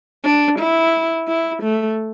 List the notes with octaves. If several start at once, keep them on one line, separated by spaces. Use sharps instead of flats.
D4
E4
E4
A3